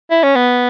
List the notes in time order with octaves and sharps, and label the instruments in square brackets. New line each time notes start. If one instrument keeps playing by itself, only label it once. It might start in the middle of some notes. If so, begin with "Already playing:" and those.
[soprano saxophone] E4
C#4
B3